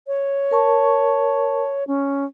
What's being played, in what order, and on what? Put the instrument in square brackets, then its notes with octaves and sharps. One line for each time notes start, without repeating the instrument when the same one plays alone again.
[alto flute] C#5
[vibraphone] A#4 A5 C#6
[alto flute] C#4